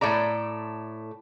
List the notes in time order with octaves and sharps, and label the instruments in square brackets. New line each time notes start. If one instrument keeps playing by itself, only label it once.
[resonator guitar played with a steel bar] A2 A3 D5 A#5